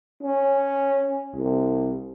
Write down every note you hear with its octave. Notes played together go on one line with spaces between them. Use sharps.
C#4
C2